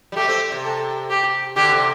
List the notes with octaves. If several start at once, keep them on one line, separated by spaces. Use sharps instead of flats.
G3
A3 G4
C4
C3
A4
G4
D3 G4
C3